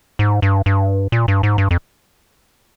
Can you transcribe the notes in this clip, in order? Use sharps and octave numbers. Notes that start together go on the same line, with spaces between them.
G#2
G2
G2
A#2
G2
G#2
G2
F2